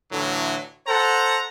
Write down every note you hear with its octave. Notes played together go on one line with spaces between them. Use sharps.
A2 D3 E3 F#3
A4 C5 F#5 A#5